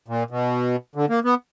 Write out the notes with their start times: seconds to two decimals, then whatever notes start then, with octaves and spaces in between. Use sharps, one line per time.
0.08 A#2
0.30 B2
0.95 D3
1.09 A#3
1.24 B3